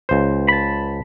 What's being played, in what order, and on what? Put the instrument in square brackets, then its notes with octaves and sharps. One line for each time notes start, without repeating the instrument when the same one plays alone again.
[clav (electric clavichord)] C#2 C5
[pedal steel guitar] A5 B5